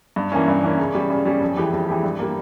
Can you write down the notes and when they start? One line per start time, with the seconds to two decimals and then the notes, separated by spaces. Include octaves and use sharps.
0.16 G2
0.32 E3 A#3 C#4
0.48 G2
0.63 E3 A#3 C#4
0.79 C#3
0.95 G3 C#4
1.10 C#3
1.25 G3 C#4
1.41 F2
1.57 E3 G#3 E4 G4
1.73 F2
1.88 E3 G#3 E4 G4
2.03 G2
2.19 G3 A#3